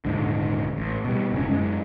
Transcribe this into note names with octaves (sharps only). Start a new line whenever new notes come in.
D#1 G#1 G#2 D3
A1
B2 G3
F1 G#2 D3 C#4
F#2 G#3